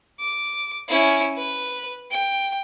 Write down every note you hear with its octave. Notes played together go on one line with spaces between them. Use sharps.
D6
C#4 E4
B4
G5